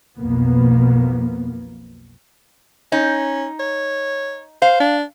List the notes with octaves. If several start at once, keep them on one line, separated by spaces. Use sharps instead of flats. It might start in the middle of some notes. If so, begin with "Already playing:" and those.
B1 F2 B2 A#3 B3
C#4 D#4
C#5
C5 F5
D4